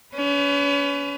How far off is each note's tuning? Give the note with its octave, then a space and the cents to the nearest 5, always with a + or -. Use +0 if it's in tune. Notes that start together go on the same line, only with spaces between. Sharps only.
C#4 +35 B4 +25